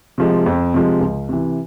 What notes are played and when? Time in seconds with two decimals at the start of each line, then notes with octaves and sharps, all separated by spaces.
0.18 C3 F3 G#3
0.46 F2
0.74 C3 F3 G#3
1.01 C#2
1.29 C3 E3